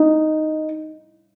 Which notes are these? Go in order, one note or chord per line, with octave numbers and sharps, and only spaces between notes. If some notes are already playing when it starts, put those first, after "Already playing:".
Already playing: D#4